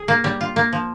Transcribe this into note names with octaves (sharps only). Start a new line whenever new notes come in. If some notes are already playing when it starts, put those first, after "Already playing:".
Already playing: G#4
A#3
G3
F4
A#3
F3